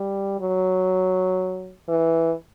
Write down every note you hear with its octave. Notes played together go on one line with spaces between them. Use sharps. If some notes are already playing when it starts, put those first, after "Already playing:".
Already playing: G3
F#3
E3